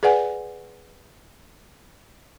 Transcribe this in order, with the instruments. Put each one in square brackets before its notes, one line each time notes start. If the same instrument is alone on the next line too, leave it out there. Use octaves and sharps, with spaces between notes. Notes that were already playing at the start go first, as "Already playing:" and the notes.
[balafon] G#4 B4 D5 F#5 G#5